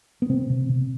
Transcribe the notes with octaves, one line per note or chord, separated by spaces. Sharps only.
B3
C3 C4
C3
C3